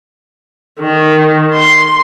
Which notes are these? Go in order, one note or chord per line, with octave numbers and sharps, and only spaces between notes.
D#3
C6